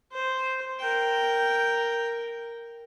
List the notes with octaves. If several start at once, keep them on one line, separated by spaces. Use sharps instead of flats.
C5
A#4 G5